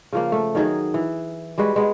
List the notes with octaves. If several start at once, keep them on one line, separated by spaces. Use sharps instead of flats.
C#3 F3 A#3
A3
D#3 F#3 D#4 G#4
E3
G3 G#3 F#4 B4
G#3 B3